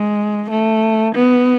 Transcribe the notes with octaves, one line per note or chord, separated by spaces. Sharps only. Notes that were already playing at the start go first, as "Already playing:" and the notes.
Already playing: G#3
A3
B3